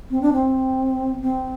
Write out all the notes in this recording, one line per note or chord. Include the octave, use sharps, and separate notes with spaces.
C4
D4
C4
C4